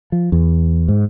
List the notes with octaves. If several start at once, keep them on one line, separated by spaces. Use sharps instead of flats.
F3
E2
G#2